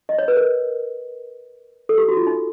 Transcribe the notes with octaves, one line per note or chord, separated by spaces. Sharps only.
D#5
C#5
B4
A#4
A4
G4
F#4
F4
D#4